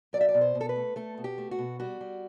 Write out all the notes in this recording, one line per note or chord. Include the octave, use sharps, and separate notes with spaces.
F#3 D5
E5
D5
B2
C5
B2
A4
B4
A3
A3 A4
B2
G4
A3
F#4
B2
G3 F#4
G3